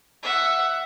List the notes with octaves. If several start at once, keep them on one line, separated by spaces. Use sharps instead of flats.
E5 F#5